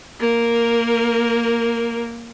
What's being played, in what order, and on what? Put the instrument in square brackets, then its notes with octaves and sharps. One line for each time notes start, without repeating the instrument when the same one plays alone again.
[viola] A#3 A#4